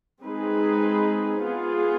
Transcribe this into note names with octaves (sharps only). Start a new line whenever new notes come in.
G#3 C4 D#4 G#4 B4
B3 F4 G#4